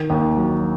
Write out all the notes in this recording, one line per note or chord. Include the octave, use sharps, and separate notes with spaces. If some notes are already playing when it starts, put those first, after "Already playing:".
Already playing: D#3
D#2
F#3